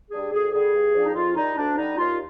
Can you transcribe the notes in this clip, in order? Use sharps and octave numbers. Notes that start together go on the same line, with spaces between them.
G3 D4 G#4
D2 G#4
D3 G3 G#4
G2
F3 C4 D4
D#4
F2 F4
D#3 G3 D#4
D2 D4
D3 G3 D#4
D#2 F4